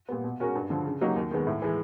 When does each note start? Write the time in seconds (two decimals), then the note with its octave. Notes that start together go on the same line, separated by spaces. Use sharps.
0.09 A#2 G3 B3
0.24 B2
0.40 G#3 C#4 F#4 A#4
0.55 G2
0.70 D3 F3
0.85 C#3
1.01 F#3 A#3 D#4 G4
1.16 D#2
1.31 D#3 G#3 B3
1.47 A2
1.62 E3 G#3